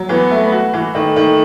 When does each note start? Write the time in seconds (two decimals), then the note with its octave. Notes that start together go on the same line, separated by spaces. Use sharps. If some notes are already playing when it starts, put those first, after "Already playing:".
Already playing: F#3
0.09 E3 B3
0.31 A3
0.52 F#4
0.73 E3
0.95 D#3 A3
1.16 D#3